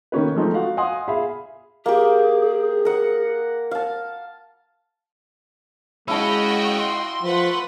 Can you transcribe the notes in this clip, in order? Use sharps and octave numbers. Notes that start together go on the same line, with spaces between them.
D#3 A#3 C#4 B4
F3 G#3 A3 C4 D#4
F#4 F5 F#5
D#5 F5 F#5 G#5 C6 D#6
G#4 E5 F5 B5
A#3 G4 G#4
A#4 F#5
F5 A5
G#3 C#4 E4 F#4 D#5 F5 G5 A5
C6
F3 A3 B4 F#5